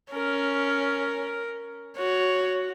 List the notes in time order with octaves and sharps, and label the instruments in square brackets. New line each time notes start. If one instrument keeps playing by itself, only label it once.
[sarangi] C#4 [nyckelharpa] A#4
[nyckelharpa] F#4 [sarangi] C#5